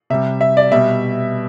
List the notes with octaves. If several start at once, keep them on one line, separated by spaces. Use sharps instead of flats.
C3 G3 E5
E5
D5
B2 G3 E5